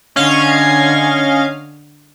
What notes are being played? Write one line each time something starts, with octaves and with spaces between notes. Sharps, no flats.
D3 C#4 D#5 F5 G#6